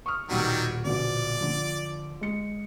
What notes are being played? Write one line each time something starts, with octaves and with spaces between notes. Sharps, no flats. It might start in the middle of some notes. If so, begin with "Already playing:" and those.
C#6 D#6 F6
D#1 B2 D#3 F#3 G3 F#5
A#1 B2 D3 D5
D3 F3
G#3 C#7